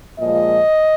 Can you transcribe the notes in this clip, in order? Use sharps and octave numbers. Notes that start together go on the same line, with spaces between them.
A#2 F3 G#3 D#5